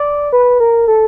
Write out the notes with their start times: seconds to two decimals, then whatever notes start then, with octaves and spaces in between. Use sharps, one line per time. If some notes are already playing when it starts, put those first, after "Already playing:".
Already playing: D5
0.33 B4
0.60 A#4
0.88 A4